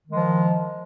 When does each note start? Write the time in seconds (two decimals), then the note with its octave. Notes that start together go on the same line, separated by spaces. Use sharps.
0.07 D#3
0.12 G#3
0.17 F3